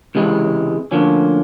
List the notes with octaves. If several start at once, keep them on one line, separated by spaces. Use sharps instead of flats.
C#2 C3 E3 G#3
D2 D3 F3 A#3 C#4